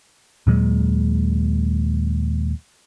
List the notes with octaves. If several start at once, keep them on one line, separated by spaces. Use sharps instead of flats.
D#2 A#2 F#3 G#3